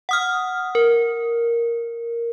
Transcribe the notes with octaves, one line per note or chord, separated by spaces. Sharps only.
F#5 D#6 F6
A#4